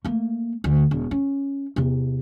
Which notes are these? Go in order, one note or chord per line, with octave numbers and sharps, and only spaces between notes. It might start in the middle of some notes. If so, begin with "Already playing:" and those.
A3 A#3
D2
E1
C#4
E2 C3